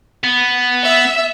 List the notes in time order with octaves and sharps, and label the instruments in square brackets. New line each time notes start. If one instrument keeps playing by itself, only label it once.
[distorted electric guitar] B3
[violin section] E5